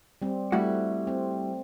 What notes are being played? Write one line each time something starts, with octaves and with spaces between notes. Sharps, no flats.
G3 C4
G3 A3 E4 F#4
C4